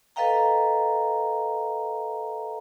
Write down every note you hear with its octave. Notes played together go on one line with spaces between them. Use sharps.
A4 B4 D#5 F5 G5 A#5